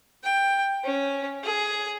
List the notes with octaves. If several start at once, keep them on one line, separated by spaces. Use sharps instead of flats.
G5
C#4
G#4